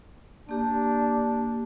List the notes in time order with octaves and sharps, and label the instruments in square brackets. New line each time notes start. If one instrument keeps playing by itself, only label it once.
[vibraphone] A#3 G4 [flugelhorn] D4